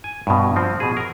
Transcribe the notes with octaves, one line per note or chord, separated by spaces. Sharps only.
G#5
G2 B2
F3 C4
B2 G#4
A#4